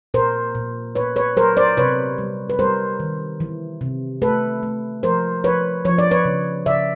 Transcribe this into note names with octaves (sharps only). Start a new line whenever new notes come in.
A#2 A#4 C5
A#2
A#2 B4 C#5
B4 C#5
F#3 A#4 C5
C5 D5
C3 B4 C#5
G3
B4
G3 A#4 C5
D#3
E3
C3
A3 A4 B4
A3
F3 A#4 C5
F3 B4 C#5
F3 C#5
D5
B4 C#5
C#3
C#3 D5 E5